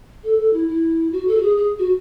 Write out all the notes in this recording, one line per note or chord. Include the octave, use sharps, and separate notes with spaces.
A4
A4
E4
E4
F#4
A4
F#4
G#4
G#4
F#4